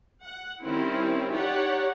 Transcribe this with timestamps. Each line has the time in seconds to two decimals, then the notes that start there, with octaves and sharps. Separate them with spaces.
0.23 F#5
0.63 D#3 G3 C4 C#4 E4
1.33 D#4 G4 C#5 D5 F#5